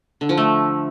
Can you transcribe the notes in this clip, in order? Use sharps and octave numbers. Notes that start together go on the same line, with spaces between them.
D3
F3
A3